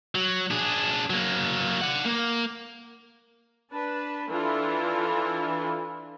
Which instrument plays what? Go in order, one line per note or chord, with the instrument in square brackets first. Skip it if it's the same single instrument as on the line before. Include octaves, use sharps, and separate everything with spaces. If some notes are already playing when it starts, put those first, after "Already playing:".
[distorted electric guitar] F#3
D4 G#4
F#3 A#3
D5 F#5
A#3
[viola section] D4 B4 A5
E3 D4 E4 F4 A4